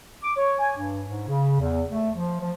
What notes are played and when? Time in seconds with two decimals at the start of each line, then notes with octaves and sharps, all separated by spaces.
0.24 D6
0.37 C#5
0.59 G#5
0.77 G2
1.08 G#2
1.28 C#3
1.61 E2
1.91 A3
2.15 F3
2.41 F3